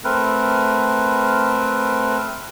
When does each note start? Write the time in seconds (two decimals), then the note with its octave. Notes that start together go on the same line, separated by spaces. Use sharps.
0.04 A3 C4 A#4 B4